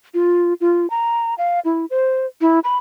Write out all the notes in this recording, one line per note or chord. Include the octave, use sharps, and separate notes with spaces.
F4
F4
A#5
F5
E4
C5
E4
B5